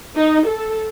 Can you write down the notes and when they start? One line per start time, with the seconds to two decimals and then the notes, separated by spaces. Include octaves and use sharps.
0.16 D#4
0.46 A4